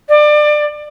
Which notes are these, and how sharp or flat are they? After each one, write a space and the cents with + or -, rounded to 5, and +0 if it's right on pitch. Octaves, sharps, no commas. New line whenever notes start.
D5 +25